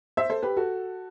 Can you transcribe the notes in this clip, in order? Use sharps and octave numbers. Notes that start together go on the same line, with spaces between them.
C5 E5
A4 C5
G4 B4
F#4 A4